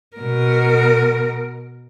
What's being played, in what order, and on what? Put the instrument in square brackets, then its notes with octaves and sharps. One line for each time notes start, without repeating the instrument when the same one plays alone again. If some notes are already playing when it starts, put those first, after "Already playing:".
[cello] B2 A#4